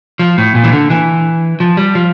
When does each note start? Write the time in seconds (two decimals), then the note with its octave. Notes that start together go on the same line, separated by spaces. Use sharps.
0.19 F3
0.38 A2
0.55 A#2
0.64 E3
0.72 D3
0.90 E3
1.60 F3
1.77 G3
1.95 F3